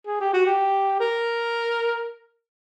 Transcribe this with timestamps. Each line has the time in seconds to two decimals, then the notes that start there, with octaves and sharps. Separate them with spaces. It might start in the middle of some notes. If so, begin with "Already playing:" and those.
0.07 G#4
0.20 G4
0.33 F#4
0.46 G4
1.00 A#4